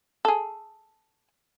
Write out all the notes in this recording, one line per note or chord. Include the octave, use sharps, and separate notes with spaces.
G#4 A4